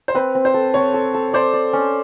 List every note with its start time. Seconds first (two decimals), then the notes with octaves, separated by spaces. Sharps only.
0.08 C5
0.15 C4 B4
0.35 C4
0.45 C5
0.54 A4
0.74 C4 C#5
0.94 A4
1.14 A4
1.34 C5 D5
1.53 D5
1.73 C#4